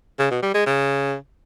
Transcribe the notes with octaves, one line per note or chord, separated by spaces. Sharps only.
C#3
B2
G3
G#3
C#3